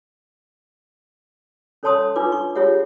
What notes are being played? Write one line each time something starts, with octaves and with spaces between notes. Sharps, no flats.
C#4 A4 C#5 A5 C6 D#6
D4 D#4 F4 B4 D6
C#6
F4 G4 G#4 C#5 E5 F#5